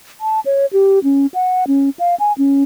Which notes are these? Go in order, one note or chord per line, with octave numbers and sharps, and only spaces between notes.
A5
C#5
G4
C#4
F#5
C#4
F5
G#5
C#4